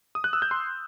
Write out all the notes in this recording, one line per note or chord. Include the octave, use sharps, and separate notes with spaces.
D#6
F#6
E6
G6
C6